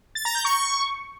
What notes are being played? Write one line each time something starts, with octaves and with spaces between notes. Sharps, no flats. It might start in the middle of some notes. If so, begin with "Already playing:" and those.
A6
A#5
G6
C#6